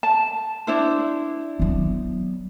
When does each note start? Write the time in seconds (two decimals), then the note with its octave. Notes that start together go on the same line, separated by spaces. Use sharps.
0.03 A5
0.67 D4 E4 C5
1.60 F#3 B3